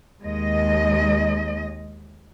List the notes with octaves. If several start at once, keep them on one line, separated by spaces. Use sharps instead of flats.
D#2 G#3 D#5